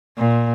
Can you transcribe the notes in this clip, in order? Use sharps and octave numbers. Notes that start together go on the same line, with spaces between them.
A#2